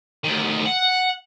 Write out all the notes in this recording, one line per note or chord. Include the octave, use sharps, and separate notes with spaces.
D2 D#3
F#5